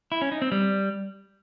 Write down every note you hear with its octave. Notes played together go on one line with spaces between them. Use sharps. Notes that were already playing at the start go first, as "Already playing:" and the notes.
E4
C#4
D#4
C4
G3